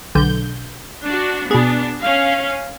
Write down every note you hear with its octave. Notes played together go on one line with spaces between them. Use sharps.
B1 D3 G6
D4 F#4
B2 B3 D4 G#4
C#4 F5